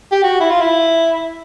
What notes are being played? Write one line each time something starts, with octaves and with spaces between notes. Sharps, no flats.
G4
F#4
E4
F4
E4